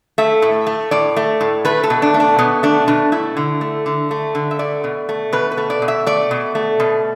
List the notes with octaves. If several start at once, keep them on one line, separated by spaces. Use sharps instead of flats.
A3 E5
A2
A3
A2 D5
A3
A2
A3 B4
A4
B2
D4
A3
D4
B2 B3
A3 D4
B2 D4
A3 E4
D3
A3
D3
A3
D3
E5
A3 D5
B2
A3
B2 B4
B4
A3
D5
B2
E5
A3 D5
B2
A3
B2